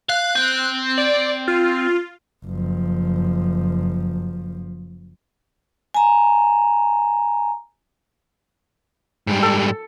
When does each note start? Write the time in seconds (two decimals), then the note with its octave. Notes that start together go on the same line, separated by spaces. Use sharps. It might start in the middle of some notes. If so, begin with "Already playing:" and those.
0.09 F5 F#6
0.35 C4
0.98 D5
1.48 F4
2.45 F#1 F3
5.94 G#5 A#5
9.27 G#2 G3
9.43 A4